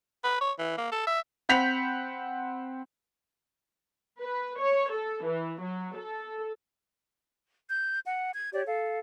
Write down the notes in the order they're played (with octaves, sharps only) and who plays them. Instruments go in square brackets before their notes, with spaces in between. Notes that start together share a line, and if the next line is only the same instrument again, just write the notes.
[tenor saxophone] B4
C#5
E3
A#3
A4
E5
[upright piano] C4 F#5 B5 G6 B6 F7
[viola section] B4
C#5
A4
E3
F#3
A4
[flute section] G6
F#5
G#6
G4 C#5 D5
A4 F5